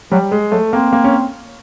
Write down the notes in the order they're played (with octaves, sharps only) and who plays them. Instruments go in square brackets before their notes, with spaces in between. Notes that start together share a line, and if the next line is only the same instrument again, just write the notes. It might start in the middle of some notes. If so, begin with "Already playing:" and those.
[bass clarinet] F#3 [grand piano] G3
[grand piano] G#3
[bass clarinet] F#3 [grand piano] A3
[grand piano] A#3 [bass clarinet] C4
[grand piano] A#3
C#4